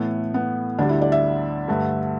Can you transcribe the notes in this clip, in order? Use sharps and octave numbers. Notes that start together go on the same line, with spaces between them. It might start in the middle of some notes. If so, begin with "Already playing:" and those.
Already playing: A2 E3 A3 B3
B3
D2 D3 G3 D4
E4
D5
E5
G2 D3 A3